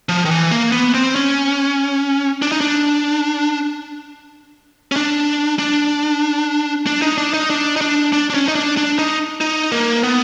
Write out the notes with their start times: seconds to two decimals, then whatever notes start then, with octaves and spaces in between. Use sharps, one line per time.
0.09 F3
0.25 D#3
0.31 E3
0.51 A#3
0.72 B3
0.94 C4
1.16 C#4
2.42 D4
2.52 D#4
2.61 D4
4.92 C#4
4.96 D4
5.59 D4
6.87 D4
7.02 D#4
7.18 D4
7.34 D#4
7.50 D4
7.76 D#4
7.81 D4
8.13 D4
8.30 D4
8.34 C#4
8.48 D#4
8.55 D4
8.77 D4
8.99 D#4
9.41 D#4
9.72 A#3
10.03 B3